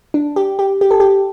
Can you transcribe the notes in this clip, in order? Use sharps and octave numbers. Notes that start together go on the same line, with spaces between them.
D4
G4
G4
G4
A4
G4